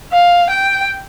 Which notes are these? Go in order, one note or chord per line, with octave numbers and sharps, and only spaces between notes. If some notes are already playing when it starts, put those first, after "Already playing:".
F5
G5